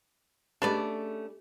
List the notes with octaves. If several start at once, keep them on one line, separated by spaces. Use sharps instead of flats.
A3 C#4 D4 G4 G#4 B4 D5 D#5